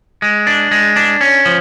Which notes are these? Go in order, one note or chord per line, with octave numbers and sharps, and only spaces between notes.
G#3
D4
G#3
D4
C#4
F3